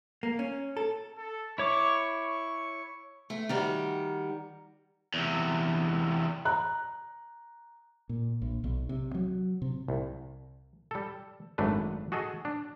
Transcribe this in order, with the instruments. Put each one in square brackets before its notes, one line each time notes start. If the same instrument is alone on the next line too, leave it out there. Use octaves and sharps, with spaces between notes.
[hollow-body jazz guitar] A#3
C#4
A4
[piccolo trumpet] A4
[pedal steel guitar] E4 C#5 D6 [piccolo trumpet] C#6
[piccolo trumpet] C#6
[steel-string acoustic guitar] A3
D#3 G3 F#4
[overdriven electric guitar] E2 C3
[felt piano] A#5 F#6
[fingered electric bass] A#2
A#1
B1
C3
F#3
C3
[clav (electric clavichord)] C2
G3 A4
G#1 F#2 A3 D4 B4
F#4 G#4 A4 D#5
D4